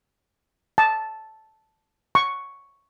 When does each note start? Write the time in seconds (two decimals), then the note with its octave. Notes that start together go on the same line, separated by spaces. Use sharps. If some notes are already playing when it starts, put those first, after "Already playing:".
0.78 A5
2.15 C#6